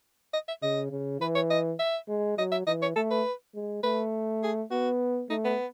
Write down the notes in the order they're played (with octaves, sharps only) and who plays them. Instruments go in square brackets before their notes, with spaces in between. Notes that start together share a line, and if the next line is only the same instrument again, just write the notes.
[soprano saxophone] D#5
E5
[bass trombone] C#3 [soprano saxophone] D#5
[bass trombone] C#3
[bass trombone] E3 [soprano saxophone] B4
[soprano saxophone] C#5
D#5
E5
[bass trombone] G#3
[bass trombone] F#3 [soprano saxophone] D#5
[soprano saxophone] E5
[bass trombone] E3 [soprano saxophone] D#5
[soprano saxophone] C#5
[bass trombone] A3 [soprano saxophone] A4
[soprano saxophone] B4
[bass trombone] G#3
[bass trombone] A3 [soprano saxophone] B4
[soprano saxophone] G#4
[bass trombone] B3 [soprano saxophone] F#4
[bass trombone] A3 [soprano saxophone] D#4
[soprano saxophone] B3